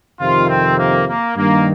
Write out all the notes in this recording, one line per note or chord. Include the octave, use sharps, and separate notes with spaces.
F2 C3 D#3 F4
C4
A#3
A#3
G2 D#3 A#3